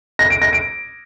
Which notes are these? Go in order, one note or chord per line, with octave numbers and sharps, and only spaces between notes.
A#6
D7
A#6
D7